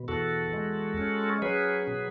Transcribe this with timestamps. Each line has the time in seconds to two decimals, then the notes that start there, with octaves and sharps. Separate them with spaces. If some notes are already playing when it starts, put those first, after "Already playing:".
Already playing: B2
0.08 E2 F#4 A4
0.53 G#3
0.98 C#4
1.42 F#3 G#4 B4
1.87 B2